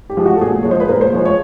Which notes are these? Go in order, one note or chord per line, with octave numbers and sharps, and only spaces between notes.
G4
F3 G#3
F#4
A4
A#2 G#4
F3 G#3 C#5
C5
B4
A#2 A#4
C5
F3 G#3 C#5
C#5